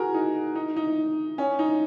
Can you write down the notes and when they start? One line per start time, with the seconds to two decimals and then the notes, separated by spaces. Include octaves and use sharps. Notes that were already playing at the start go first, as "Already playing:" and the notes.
Already playing: F#4 G#4 A#4
0.14 D#4
0.55 D#4
0.76 D#4
1.38 C#4
1.59 D#4